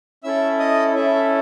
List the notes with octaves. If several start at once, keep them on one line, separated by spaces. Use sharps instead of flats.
C#4 E4 A4 E5 E6
D#5 D#6
C#4 E4 A4 E5